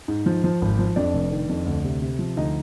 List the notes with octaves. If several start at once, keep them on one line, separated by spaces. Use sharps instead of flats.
G#2
F3
F3
G#1
F3
F2 D4 D5
F1
D#3
F2
D2
C3
C3
F3
D2 D#4 D#5